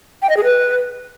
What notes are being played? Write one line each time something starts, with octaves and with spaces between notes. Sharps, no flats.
G5
D#5
G#4
B4